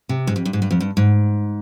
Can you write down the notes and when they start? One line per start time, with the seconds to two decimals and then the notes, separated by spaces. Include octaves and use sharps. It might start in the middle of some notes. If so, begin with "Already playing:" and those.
0.09 C3
0.27 G#2
0.36 F2
0.45 G2
0.53 G#2
0.62 G2
0.71 F2
0.81 G2
0.97 G#2